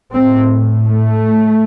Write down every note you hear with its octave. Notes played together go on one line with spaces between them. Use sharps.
A2 C4
A3